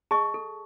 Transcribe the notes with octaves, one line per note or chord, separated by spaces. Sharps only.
G#4 D#5 A5 C#6
A4